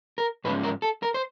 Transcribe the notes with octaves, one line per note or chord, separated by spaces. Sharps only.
A#4
G#2 F3 G#3 C#4 B4
A#4
A4
A#4
C5